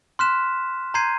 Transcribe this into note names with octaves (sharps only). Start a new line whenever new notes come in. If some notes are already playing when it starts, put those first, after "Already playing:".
C6 F6 F#6 B6 E7
A#5 C6 G6 G#6 C7 D#7